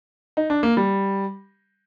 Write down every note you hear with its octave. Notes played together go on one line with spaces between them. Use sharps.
D#4
D4
A#3
G3